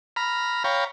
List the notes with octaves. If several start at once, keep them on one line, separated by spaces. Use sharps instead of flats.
A#5 B5 F6
C#5 F5 G5 A#5 B5